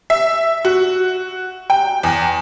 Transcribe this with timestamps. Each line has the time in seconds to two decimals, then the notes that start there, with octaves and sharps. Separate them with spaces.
0.10 E5
0.65 F#4
1.70 G5
2.03 E2